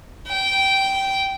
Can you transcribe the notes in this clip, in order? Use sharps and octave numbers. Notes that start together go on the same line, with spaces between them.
G5